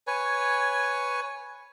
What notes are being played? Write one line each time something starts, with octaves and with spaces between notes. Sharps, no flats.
B4 C#5 G#5